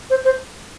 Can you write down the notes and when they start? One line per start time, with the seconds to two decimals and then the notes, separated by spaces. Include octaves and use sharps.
0.10 C5
0.25 C5